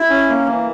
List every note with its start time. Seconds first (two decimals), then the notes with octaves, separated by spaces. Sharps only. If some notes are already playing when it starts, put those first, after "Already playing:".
Already playing: E4
0.10 C#4
0.29 A#3
0.46 E3